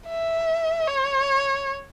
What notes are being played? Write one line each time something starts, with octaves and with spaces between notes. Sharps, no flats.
E5
C#5